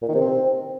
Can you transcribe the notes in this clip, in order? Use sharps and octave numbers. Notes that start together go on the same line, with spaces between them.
A#2
D#3
C3
C4